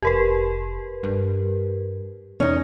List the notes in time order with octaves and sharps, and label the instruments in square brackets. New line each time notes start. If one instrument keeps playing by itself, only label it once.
[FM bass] F1 [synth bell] G4 A#4 B4
[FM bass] G2
[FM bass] E2 [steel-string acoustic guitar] C#4 D#4